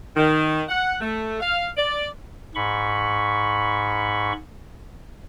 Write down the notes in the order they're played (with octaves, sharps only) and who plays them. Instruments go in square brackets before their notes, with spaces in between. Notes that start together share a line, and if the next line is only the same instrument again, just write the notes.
[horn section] D#3
F#5
A3
F5
D5
[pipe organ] G#2 B5 C#6